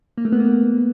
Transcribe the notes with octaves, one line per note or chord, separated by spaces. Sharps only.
A#3
A3
B3
A#3